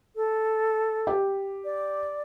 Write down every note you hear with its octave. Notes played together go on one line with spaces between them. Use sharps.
A4
G4
D5